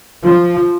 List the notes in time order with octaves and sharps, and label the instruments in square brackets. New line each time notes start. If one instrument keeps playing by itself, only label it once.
[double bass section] F3